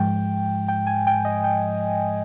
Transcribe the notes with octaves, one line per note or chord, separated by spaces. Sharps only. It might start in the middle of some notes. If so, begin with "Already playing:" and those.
Already playing: G#2 F3 G#3 G5
G5
G#5
G5
D#5
G5